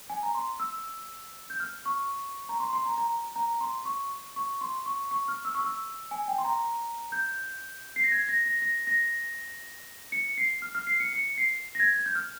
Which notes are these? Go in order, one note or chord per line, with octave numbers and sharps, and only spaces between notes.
G#5
A#5
C6
E6
G6
F6
C#6
A#5
C6
C6
A#5
A#5
A#5
C6
C#6
C#6
C6
C#6
C#6
F6
E6
C#6
E6
G#5
G5
C6
A#5
G6
C7
A#6
G#6
A#6
A#6
A#6
A#6
C#7
C7
F6
F6
C7
C#7
C#7
C7
A#6
G#6
G#6
G6
F6